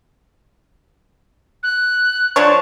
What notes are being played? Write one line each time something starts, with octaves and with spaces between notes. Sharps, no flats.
F#6
F3 D4 C#5 A5